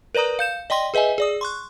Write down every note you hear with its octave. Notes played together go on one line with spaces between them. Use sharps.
A#4 B4 D5 A#5 D#6
F5 G6 E7
D5 D#5 G5 C6 A#6
G#4 B4 D#5 E5 G#5
G#4 D5 D#6
C6 C#6 F#6